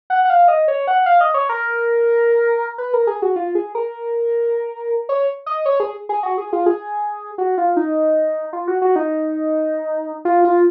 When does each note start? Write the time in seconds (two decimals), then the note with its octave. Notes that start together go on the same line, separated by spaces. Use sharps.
0.10 F#5
0.25 F#5
0.30 F5
0.48 D#5
0.68 C#5
0.87 F#5
1.06 F5
1.21 D#5
1.34 C#5
1.49 A#4
2.78 B4
2.93 A#4
3.07 G#4
3.22 F#4
3.36 F4
3.55 G#4
3.75 A#4
5.09 C#5
5.46 D#5
5.66 C#5
5.80 G#4
6.09 G#4
6.23 F#4
6.38 G#4
6.53 F4
6.66 G#4
7.38 F#4
7.58 F4
7.76 D#4
8.53 F4
8.68 F#4
8.82 F#4
8.96 D#4
10.25 F4
10.45 F4